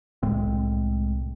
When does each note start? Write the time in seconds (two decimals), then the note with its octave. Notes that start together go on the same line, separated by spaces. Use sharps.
0.23 C2 A2 G#3 C4